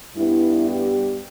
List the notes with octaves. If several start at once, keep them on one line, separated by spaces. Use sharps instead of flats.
G2 G3 B3 E4
G4